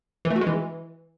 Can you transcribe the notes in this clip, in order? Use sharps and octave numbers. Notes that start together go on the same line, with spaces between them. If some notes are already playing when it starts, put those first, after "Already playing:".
E3
A3
F#4
G#3
E3